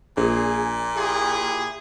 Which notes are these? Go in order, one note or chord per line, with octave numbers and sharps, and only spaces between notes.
A#1 A#2 G#4
E4 G4 G#4